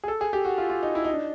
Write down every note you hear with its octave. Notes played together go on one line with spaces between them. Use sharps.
G#4
A4
G#4
G4
F#4
F4
F4
D#4
E4
D#4
D4